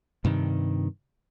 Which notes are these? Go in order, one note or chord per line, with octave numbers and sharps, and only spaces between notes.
G2 C3 D#3